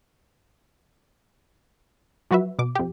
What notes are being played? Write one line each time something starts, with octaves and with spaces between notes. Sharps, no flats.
F3 F#3 F#4 B4 E5
B2 D6
F2 G4